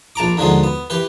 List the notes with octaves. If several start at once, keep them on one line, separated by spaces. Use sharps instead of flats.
A#1 A5 A#5 D6
D#2 D3 F3 F#3 G#3
B3
E3 G4 B4